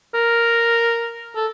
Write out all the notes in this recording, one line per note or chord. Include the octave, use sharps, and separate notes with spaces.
A#4
A4